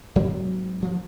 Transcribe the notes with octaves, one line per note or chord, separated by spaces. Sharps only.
G#2 F#3 A#3 C4
D2 F3 A#3